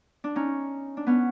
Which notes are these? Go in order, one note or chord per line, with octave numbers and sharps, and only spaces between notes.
D4
C#4 D#4
D4
B3 C#4